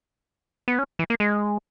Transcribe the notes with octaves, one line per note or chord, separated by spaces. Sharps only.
B3
C#4
E3
A#3
G#3